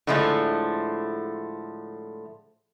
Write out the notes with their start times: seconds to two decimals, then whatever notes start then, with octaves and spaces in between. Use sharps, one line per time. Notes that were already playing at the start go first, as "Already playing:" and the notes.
0.07 A2 D3 F3 G#3 A3